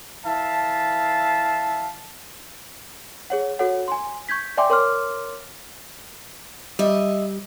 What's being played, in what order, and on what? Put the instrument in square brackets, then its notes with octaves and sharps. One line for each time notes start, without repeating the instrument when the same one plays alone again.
[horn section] E3 E5 F5 A5
[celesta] G#4 C#5 F#5
F#4 A4 C#5 F#5
G#5 C6
C#6 G6 G#6 B6
D5 E5 G5 G#5 C6 D6
A#4 C#5 C6 D6 F6
[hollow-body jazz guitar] G3 [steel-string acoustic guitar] D#5 E5